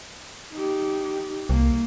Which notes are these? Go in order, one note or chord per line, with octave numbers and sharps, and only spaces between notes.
D#4 G4
C2 A#3